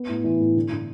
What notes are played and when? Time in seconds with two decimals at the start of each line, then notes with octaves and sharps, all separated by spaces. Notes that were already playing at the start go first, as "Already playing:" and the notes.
Already playing: B3
0.09 A2
0.24 E3
0.40 A2
0.56 D3
0.72 D3